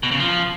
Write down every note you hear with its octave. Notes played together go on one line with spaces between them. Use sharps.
B2
C#3
F3